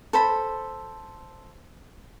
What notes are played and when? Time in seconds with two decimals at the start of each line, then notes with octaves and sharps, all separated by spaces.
0.13 A4 C5 B5